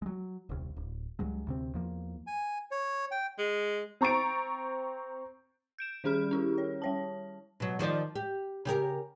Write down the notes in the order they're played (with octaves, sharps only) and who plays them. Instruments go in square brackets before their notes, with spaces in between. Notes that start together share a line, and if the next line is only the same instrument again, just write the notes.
[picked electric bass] F#3 G#3
D#1 C2
D1
C#2 G2 F#3 G#3
D2 C3 C4
E2 F3 A#3
[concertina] G#5
C#5
G5
[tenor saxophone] G#3
[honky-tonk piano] C4 A#5 C#6 A6 D7
[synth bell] G6 D7 E7
D#3 G3 C#4 G#4 B5 F6
C#4 E4 G4
C#5
G3 C#5 A5
[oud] B2 F#3
D#3 F3 D5
G4
C#3 G4 A#4